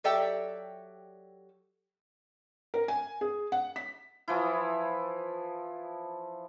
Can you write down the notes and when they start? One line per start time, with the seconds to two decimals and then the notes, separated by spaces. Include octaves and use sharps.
0.04 F#3 G4 A4 D5 E5 G5
2.74 A#4
2.88 G#5
3.21 G#4
3.52 F#5
3.76 B6
4.28 E3 F3 E4